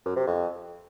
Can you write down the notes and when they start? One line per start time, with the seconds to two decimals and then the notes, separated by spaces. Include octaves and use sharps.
0.05 F#2
0.16 C3
0.27 F2